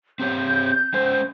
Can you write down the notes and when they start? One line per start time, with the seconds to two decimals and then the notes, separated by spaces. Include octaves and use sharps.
0.20 C4 G4 C#5 G6
0.94 G#3 C#4 C5